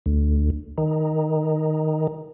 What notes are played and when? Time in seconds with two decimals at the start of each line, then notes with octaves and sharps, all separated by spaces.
0.06 D2
0.78 D#3